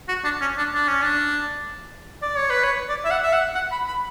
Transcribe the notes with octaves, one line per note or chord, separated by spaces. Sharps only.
F#4
D4
C#4
D4
D4
C#4
D4
D5
C#5
B4
C#5
D5
E5
F#5
E5
F#5
F#5
B5
B5